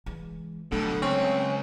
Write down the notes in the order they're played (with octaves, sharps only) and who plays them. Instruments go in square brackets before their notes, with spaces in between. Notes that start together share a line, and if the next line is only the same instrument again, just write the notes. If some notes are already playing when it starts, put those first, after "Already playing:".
[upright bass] E3 G#3
[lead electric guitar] B2 G3 [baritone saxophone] D3 [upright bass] F#3 A3
[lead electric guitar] C#2 [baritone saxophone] C4 [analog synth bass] C#4